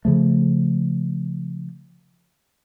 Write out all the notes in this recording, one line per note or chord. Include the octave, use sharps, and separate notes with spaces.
C#3 F3 A3